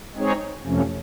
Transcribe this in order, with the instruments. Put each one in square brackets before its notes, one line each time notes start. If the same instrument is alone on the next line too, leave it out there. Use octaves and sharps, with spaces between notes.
[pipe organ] G#3 C4 D#4 G#4 C#5
F2 C3 F3 A3 C#4